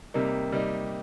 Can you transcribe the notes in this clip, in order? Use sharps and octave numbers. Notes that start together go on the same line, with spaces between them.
C3 G3 A#3 D#4
C3 G3 A#3 D#4